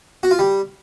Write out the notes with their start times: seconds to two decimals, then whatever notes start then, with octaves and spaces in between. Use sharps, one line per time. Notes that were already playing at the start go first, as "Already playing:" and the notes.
0.23 F#4
0.31 F4
0.39 G3